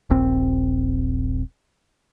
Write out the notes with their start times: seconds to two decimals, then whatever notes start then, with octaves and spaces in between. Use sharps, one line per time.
0.10 D#1 A#1 C4